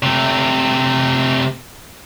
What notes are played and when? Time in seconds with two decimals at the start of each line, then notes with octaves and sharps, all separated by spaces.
0.03 C3 A3